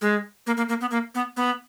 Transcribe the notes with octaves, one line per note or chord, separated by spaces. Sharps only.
G#3
A#3
A#3
A#3
B3
A#3
B3
B3